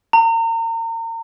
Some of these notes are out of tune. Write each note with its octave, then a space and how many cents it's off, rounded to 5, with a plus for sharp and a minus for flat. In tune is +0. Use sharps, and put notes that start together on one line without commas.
A#5 -35